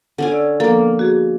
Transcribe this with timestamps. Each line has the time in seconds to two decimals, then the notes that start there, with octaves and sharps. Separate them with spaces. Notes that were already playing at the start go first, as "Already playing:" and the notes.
0.18 D3 C#4 G#5
0.31 D5 E6
0.60 F3 A#3 B3 A4
0.99 F#4 G#4